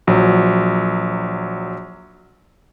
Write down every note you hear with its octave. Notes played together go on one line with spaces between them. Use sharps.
A#1 F#3